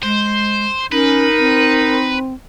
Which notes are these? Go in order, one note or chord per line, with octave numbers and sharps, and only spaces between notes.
G#3 C5
C#4 D#4 A#4 B4
C4